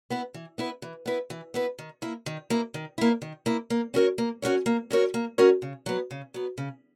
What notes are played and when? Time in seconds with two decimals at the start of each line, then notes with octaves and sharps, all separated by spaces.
0.10 B3 E4 B4
0.34 E3
0.58 B3 E4 B4
0.82 E3
1.06 B3 E4 B4
1.30 E3
1.54 B3 E4 B4
1.79 D#3
2.02 A#3 E4
2.26 D#3
2.50 A#3 E4
2.74 D#3
2.98 A#3 E4
3.22 D#3
3.46 A#3 E4
3.70 A#3
3.94 C#4 F#4 A#4 C#5
4.18 A#3
4.42 C#4 F#4 A#4 C#5
4.66 A#3
4.91 C#4 F#4 A#4 C#5
5.14 A#3
5.38 C#4 F#4 A#4 C#5
5.62 C#3
5.86 F#3 B3
6.11 C#3
6.34 F#3 B3
6.58 C#3